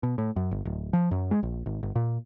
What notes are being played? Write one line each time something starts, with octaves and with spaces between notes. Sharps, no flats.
B2
A2
F#2
G1
D1
F3
F#2
G#3
A#1
G#1
G1
A#2